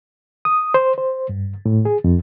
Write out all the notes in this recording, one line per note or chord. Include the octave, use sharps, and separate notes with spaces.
D#6
C5
C5
G2
A2
G#4
F2